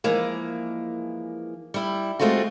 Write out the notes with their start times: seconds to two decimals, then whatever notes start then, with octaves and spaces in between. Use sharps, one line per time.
0.04 E3 F3 G#3 A#3
1.74 G3 E4
2.19 G#3 A3 C4 F4 F#4